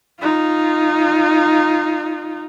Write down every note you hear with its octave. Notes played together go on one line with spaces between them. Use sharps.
D#4 F4